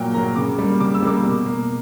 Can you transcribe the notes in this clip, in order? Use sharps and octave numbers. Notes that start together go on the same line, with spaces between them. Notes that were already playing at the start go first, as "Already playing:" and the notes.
Already playing: A#2 F#3 A#3 G5
F#3 A#3 A#5
C#3 D6
G3 A#3
C#3 D6
E6
G3 A#3 D6
B2
A#3